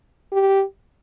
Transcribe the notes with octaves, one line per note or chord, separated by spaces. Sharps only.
G4